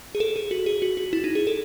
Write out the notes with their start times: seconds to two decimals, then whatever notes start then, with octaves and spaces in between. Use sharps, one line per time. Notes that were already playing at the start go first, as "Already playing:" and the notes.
0.15 G#4
0.20 A4
0.36 G#4
0.51 F#4
0.66 G#4
0.82 F#4
0.97 F#4
1.13 E4
1.24 D#4
1.35 G#4
1.47 A4